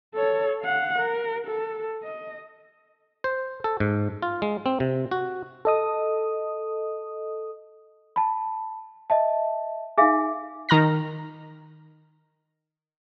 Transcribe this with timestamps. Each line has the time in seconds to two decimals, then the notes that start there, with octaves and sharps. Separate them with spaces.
0.14 A4 C#5
0.62 F5 F#5
0.99 A#4
1.47 A4
2.03 D#5
3.24 C5
3.64 A4
3.80 G#2
4.22 F4
4.42 G#3
4.66 C4
4.80 C3
5.11 F#4
5.65 A4 D#5 D#6
8.16 A5 B5
9.10 D#5 E5 A5
9.98 D#4 G#4 E5 F5 G#5
10.69 D#3 A#5 F6 A#6